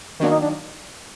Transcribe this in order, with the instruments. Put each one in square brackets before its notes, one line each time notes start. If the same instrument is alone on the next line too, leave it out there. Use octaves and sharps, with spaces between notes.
[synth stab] D#3 F#3 A#3 [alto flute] D4
[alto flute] D#4
D4